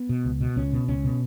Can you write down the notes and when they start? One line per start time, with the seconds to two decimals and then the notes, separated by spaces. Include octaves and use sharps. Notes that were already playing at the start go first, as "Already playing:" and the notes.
Already playing: B3
0.09 B2
0.25 C#2
0.41 B2
0.56 C#2 C#4
0.73 B2
0.88 C#2 C#4
1.04 B2